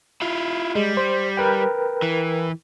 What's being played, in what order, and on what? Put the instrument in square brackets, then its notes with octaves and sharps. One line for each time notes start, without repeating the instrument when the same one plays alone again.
[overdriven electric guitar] E4 F4
[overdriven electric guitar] G3 [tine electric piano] G#3
[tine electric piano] C5
A#4 B4 G5
[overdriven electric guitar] E3